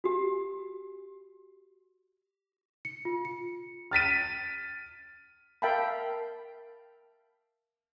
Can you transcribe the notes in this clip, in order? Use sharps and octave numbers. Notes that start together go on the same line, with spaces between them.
F#4 G4
C#7
F4
C#7
F6 A6 B6 D#7
A#4 E5 F5 G5 A5 B5